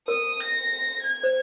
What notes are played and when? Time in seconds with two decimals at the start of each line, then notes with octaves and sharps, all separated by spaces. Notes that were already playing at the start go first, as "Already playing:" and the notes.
0.08 A#4 D#6
0.40 A#6
1.03 G#6
1.23 C5